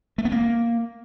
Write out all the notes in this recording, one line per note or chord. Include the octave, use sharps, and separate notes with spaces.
A3
B3
A#3